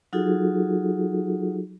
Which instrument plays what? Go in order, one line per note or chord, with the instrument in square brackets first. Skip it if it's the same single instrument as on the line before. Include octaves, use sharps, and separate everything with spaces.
[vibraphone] F#3 D#4 F4 F#4 G#4 A4